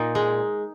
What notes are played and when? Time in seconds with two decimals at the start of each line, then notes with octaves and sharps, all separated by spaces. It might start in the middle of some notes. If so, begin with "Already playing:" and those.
Already playing: A#2 D#4
0.15 G#3